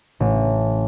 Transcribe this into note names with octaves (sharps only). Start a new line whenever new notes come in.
A1